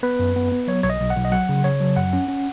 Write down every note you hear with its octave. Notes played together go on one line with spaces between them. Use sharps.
B3 B4
F#2
B3
B3
F#3 C#5
B1 C#5
D#5
B1
F#5
B1
D#5
F#3 F#5
C#3
C#3 C#5
F#3
F#2 F#5
C#4
C#4